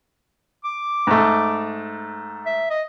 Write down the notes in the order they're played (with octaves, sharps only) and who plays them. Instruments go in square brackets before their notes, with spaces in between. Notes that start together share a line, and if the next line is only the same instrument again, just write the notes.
[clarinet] D6
[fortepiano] G#2 A3
[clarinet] E5
D#5